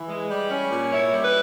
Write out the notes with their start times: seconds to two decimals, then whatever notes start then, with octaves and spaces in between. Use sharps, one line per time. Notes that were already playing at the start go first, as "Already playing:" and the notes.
Already playing: E3
0.08 G#3
0.29 G3
0.50 C#4
0.71 A#2
0.92 E4 C#5
1.13 G3
1.23 B4